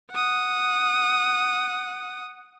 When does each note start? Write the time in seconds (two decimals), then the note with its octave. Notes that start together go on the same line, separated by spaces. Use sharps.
0.11 F#5 D#6